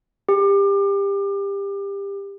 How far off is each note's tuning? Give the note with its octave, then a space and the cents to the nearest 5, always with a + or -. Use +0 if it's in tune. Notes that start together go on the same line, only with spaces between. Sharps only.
G4 +25